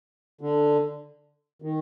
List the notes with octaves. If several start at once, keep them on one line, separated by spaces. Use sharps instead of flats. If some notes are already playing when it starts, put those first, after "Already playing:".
D3
D#3